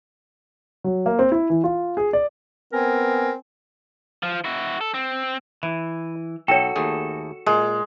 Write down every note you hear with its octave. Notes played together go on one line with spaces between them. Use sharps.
F#3
A#3
C4
E4
E3
F4
G#4
D5
B3 C4 A#4 G#5
F3
E4 F#4
A4
C4
E3 E4
B1 F#4 A4 C#5 G5
D#2 A3 G#4
A#2 G#3